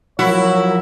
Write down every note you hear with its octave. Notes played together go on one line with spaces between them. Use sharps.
F3 F#3 E4 F#4 A#4 C#5